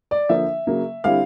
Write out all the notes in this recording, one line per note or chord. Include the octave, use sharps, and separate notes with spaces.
D5
D3 F3 A#3 E5
C#3 F#3 A#3
D3 G3 C4 E4 F5